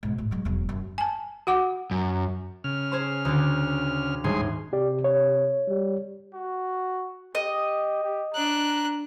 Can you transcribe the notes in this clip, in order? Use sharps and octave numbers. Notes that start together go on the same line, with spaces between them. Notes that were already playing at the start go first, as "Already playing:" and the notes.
G#2 B2
A2
F#3 G#3
E1 F#3
F#2
G#5 A5
F#4 F#5 D6
F#2
C#3 F6
G#4 C5 C6
D2 D3
D#1 G#2 G#4 C6
C3 G4 D5
C#5
G3
F#4
G4 D#5
G4
D4 A#5 F#6